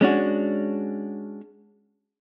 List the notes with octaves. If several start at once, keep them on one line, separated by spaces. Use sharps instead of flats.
G#3 C#4 D4 F#4